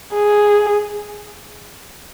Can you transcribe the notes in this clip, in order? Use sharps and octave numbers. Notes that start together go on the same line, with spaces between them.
G#4